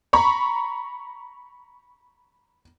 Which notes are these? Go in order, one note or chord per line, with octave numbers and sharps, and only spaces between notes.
A#5 B5 C#6